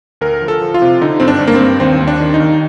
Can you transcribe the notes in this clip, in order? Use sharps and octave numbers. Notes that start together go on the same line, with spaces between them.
D2 A#4
F3
A4
F3
F4
C3
D3 D#4
G2 C4
D4
G2
A#3
C4
G2
D#2 C4
D#2
D4
D#3
D#4
D#2